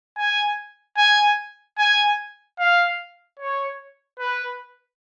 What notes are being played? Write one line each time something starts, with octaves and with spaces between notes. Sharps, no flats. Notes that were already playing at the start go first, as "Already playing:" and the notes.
G#5
G#5
G#5
F5
C#5
B4